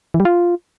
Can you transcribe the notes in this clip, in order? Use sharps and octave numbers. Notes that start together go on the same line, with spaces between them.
E3
G3
F4